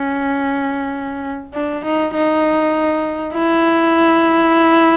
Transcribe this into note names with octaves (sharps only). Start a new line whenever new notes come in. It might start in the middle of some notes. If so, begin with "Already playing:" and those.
Already playing: C#4
D4
D#4
D#4
E4